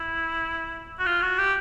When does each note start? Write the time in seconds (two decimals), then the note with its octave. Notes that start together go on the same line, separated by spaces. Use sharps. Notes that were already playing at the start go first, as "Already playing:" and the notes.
Already playing: E4
0.99 F#4
1.06 F4
1.22 F#4
1.39 G4